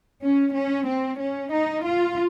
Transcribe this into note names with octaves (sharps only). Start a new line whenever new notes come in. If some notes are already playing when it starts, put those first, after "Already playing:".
C#4
C#4
C4
C#4
D#4
F4